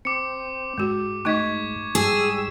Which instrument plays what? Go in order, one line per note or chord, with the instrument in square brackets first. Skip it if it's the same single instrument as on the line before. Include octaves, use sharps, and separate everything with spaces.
[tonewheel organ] C4 [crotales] D6 C#7
[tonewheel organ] G#2 [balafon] G#3 F#4
[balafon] A3 D#4 D#5 [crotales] C#6 G#6 B6
[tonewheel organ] G#2 G3 E6 [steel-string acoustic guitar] G#4